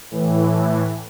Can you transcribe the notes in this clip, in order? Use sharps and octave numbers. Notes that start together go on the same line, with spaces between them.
A2 E3